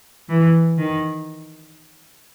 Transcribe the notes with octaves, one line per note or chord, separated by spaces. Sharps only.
E3
D#3